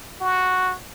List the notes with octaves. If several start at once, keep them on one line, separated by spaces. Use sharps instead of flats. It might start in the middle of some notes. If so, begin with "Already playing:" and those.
F#4